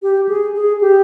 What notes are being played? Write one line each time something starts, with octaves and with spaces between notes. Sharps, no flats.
G4
G#4
G#4
G4